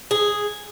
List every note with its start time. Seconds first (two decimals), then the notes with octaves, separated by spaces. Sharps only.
0.11 G#4